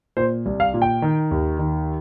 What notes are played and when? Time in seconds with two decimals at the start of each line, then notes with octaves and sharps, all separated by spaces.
0.17 A#2 C5
0.46 C2
0.60 F5
0.74 A#2
0.82 G5
1.02 D#3
1.31 D#2
1.59 D#3